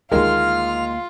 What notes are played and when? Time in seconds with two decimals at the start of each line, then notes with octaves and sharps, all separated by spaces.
0.11 D2 D#3 G#3 A#3 F4 F6